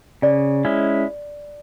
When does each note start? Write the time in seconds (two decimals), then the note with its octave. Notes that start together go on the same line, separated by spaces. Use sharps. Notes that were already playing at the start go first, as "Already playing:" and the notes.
0.22 C#3 D5
0.65 G#3 C#4 E4